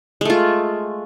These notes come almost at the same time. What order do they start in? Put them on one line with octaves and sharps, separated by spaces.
G#3 A3 F4